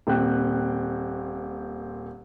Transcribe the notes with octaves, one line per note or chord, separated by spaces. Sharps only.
D#1 A#2 C4 G5 F#6